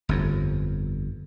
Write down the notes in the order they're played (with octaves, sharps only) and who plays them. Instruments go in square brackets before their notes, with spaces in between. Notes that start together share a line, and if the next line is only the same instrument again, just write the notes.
[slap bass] G1 F2